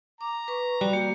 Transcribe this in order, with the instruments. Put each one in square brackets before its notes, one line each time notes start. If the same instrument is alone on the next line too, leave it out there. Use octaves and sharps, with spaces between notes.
[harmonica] A#5 [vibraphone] D6
[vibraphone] B4 C#6
[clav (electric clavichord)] G3 [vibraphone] F#4
[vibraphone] A#3 G4